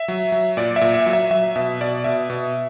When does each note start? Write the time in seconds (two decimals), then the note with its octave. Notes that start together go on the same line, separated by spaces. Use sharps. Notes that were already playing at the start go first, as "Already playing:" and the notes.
Already playing: E5
0.08 F#3
0.32 F#3
0.57 A#2 D5
0.76 E5
0.81 A#2
0.94 E5
1.06 F#3
1.13 E5
1.31 F#3 E5
1.56 B2 E5
1.81 B2 D5
2.04 B2 E5
2.30 B2